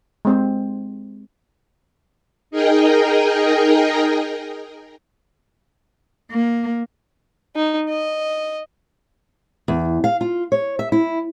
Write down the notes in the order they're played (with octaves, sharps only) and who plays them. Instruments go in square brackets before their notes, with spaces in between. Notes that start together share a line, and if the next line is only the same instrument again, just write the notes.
[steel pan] G#3 C4 C5
[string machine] D#4 G#4 A#4 D#5 G5
[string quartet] A#3
[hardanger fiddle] D#4
D#5
[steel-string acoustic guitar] E2
F5
F4
C#5
E5
E4